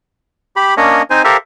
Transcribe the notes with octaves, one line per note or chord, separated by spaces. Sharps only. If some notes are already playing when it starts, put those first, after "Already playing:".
G4 B5
A#3 C#4 D4 C#5 D#5
C4 D#4 C5 G#5
G4 A4 A#4 C5 E5 F5